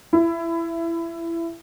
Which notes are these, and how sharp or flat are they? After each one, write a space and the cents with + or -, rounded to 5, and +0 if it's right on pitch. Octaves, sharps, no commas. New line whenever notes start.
E4 +25